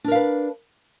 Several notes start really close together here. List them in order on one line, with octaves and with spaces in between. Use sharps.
D4 A#4 F5 B4